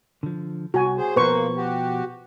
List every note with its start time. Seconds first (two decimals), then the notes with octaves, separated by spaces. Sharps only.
0.23 D3 F3
0.74 C2 F#4 G#5
0.97 G#4 C5
1.16 B2 D#3 F3 A#3 B4 C5 C#6
1.56 F#4 G4